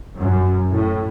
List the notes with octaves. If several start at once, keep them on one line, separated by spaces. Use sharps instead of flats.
F#2
A2